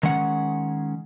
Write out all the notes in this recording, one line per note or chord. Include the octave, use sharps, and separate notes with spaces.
D#3 G#3 C#4 F#5